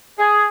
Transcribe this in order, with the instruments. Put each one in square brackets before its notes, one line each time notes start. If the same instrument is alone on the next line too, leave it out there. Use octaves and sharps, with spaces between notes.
[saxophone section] G#4